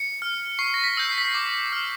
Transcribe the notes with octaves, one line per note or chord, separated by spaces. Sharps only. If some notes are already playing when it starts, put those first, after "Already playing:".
Already playing: C#7
F6
C#6 C7
A#6
B6
E6 G6
C7
B6
C7
D6
F6